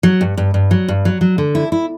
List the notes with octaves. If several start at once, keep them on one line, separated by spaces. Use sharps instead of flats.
F#3
G2
G2
G2
F#3
G2
F#3
F#3
D3
E4
E4